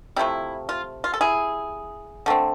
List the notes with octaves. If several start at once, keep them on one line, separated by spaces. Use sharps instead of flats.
C3 F3 A3 E4
F4
F4
A4
E4 G#4
D3 A3 C4